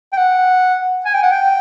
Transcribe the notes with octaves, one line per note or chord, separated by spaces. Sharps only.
G5
F#5
G#5
G5
F#5
G5